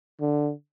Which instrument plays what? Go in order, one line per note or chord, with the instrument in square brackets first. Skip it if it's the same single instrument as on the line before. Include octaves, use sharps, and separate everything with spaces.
[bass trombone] D3